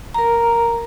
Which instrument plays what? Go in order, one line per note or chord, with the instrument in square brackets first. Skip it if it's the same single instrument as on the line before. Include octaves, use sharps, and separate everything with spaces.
[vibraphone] A#4 A#5